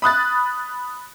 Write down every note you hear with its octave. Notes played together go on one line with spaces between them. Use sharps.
B5 D#6 F#6 A6